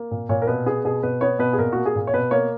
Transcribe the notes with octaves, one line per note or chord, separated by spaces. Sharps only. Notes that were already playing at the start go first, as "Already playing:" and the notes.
Already playing: A#3
A#2
A#2 C#5
A#4
B2 B4
B3 G#4
B2 G#4
B2 B4
B3 C#5
B2 B4
G#4
A#2 A#4
A#3 F#4
G#4
A#2
C#5
B2 B4
A#3 C#5